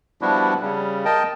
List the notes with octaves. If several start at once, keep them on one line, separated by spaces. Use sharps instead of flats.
F3 G3 B3 D4 E4 F#4
C#3 G3
A#4 D#5 G5 A5